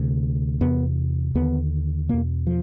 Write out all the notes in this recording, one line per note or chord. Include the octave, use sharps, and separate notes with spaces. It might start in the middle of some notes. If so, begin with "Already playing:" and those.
Already playing: D2 C3
E2 C3 B3
D#2 D3 B3
E2 B2 A#3
F3